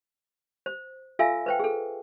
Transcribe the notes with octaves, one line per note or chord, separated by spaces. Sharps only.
C5
F4 A4 E5 F5 G#5 E6
B4 C5 G5
G#4 A4